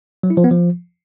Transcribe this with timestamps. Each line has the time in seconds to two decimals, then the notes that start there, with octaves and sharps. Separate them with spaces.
0.23 F#3
0.30 E4
0.37 F3
0.44 B3
0.51 F3